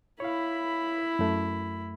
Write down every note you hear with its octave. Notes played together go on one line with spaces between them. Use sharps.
E4 C#5 F5 B5
F#2 A3